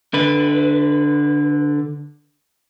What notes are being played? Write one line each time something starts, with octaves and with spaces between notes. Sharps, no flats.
D3 B4